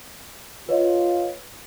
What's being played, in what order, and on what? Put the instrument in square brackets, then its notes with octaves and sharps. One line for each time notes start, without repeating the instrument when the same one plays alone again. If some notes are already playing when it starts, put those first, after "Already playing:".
[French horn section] F4 [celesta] B4 C#5 D#5